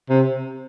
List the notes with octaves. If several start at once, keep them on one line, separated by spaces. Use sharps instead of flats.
C3